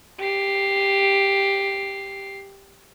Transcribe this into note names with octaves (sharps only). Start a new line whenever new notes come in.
G4 C7